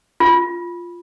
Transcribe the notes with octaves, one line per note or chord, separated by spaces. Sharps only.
F4